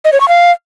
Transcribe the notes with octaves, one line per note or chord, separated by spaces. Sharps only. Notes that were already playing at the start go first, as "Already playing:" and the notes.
D#5
C#5
C#6
F5